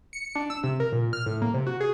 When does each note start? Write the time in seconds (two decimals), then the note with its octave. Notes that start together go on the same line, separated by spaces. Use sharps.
0.13 C#7
0.35 D4
0.50 E6
0.63 C3
0.80 A#4
0.92 A#2
1.13 F6
1.26 A2
1.42 A#3
1.54 C3
1.67 F#4
1.80 G#4